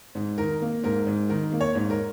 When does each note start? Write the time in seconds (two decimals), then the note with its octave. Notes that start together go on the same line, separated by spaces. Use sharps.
0.15 G#2
0.38 D#3 A#4
0.62 A#3
0.83 G#2 A#4
1.07 G#2
1.29 D#3 A#4
1.53 A#3
1.61 C#5
1.75 G#2
1.90 A#4